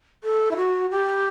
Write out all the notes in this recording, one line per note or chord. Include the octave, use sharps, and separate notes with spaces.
A4
E4
F#4
G4